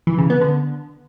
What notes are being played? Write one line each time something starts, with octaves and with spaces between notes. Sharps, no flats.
E3
C#3
B3
D3